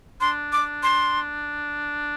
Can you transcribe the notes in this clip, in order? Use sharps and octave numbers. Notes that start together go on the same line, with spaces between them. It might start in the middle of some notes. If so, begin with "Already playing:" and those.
D4 C6
D6
C6